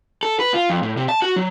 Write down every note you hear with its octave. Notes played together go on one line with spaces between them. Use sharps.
A4
B4
F4
F2
A2
C3
A5
F#4
F#3